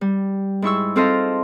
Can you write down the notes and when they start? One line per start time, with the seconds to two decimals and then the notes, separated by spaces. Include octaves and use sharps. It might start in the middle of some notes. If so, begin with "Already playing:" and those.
0.01 G3
0.62 G#2 E4 C#6 E6
0.96 C4 F4 A4 C5 D#5 F5